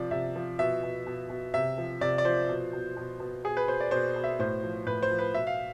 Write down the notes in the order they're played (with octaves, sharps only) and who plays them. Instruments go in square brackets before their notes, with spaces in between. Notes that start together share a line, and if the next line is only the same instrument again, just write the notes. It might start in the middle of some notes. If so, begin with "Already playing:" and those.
Already playing: [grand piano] C3 F3 D5
C3 E5
F3
B2 E5
B2
B2
B2
C3 E5
F3
C3 D5
D5
F3 C5
B2
B2
B2
B2
B2 G#4
B4
B2 C5
D5
B2 C5
B2
E5
A2 C5
F3
A2 B4
C5
F3
B4
B2 E5
F5